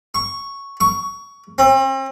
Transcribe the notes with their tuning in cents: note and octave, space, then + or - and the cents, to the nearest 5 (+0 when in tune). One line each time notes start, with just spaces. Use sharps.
C#6 +0
C#6 +20
C4 +40